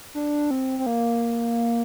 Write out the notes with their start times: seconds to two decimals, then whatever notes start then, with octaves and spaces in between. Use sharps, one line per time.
0.14 D4
0.51 C4
0.79 C4
0.86 A#3